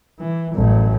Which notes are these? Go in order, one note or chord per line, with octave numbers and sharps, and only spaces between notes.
E3
A1 F#2